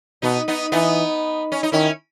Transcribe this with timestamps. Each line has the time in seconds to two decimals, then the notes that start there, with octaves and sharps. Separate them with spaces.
0.22 B2 B3 D#4
0.48 B3 D#4
0.72 E3 B3 D#4
1.52 C#4
1.63 D#4
1.72 D#3 C#4 E4